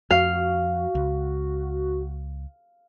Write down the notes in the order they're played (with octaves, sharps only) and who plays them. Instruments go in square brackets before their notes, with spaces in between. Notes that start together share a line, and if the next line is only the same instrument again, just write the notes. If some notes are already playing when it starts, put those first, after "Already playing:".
[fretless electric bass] F2 [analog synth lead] F#4 [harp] F5
[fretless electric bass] C#2